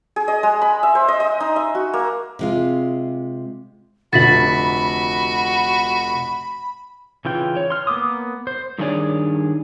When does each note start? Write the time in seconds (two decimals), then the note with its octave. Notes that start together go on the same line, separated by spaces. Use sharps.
0.16 G#4
0.28 D#5
0.43 G#3
0.62 B5
0.83 E5
0.95 C5
1.08 D#5
1.20 D#5
1.40 D#4
1.56 E5
1.75 F#4
1.94 A#3
2.39 C3 G#3 F4
4.13 F1 D2 D3 F#4 B5 A6 B6 F#7
7.25 C#3 E3 F4 G5
7.57 C#5
7.70 C6 F6
7.87 A#3 B3 D6 D#6
8.47 C5
8.78 G2 D#3 A3 G#4 C#5 D5